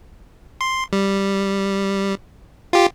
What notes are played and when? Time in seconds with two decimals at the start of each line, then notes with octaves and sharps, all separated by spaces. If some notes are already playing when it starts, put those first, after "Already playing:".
0.61 C6
0.93 G3
2.73 F4 G4